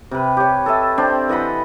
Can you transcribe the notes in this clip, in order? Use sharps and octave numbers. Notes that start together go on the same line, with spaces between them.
C3 B4
G4 C#5
A4 D#5 E5 A5
C4 D4 C5
E3 D#5 F#5 B5